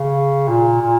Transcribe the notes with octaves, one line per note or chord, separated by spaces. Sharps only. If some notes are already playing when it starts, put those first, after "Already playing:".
Already playing: C#3
A#2
A#2